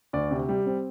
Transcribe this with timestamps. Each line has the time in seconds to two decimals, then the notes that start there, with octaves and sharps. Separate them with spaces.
0.13 D2 D5
0.31 C3
0.49 G3
0.66 C4